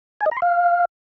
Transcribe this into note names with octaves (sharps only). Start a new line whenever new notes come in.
G#5
D#5
A#5
C6
F5